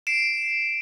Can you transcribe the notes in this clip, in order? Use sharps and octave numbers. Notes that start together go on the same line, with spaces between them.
C7 D7 E7